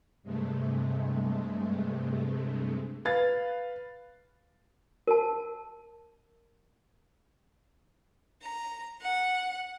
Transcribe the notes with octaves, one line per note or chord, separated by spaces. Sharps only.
G2 C3 G#3 A3
B4 F5 A6
A#4 A5
A#5
F#5